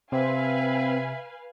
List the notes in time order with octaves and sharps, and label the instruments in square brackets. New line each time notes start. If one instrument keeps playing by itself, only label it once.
[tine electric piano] C3 [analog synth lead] C4 [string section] B4 F5 G#5 [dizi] E5